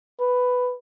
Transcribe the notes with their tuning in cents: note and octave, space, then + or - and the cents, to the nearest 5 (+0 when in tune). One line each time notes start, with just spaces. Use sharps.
B4 +5